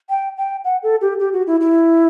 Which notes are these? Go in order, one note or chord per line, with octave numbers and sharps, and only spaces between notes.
G5
G5
F#5
A4
G4
G4
F#4
E4
E4